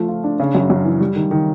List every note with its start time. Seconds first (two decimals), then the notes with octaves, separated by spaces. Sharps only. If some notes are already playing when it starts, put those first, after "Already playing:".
Already playing: F3 A3
0.09 F4
0.24 D4
0.40 C#3
0.55 F#2
0.70 F#2
0.85 E3
1.01 G3
1.16 D#3
1.31 D#3